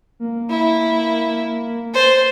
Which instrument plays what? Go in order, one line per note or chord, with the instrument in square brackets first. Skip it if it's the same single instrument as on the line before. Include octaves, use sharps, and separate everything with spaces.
[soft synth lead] A#3
[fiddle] E4
[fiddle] C5 [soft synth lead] A6